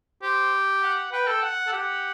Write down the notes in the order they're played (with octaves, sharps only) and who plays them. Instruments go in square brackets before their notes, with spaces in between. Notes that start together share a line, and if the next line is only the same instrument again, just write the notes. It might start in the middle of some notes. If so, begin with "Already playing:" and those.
[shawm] G4 [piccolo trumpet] C5
[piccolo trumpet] F#5
[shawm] B4 [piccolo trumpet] G5
[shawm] A4
[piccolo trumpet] F#5
[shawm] A4
[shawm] G4 [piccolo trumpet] F#5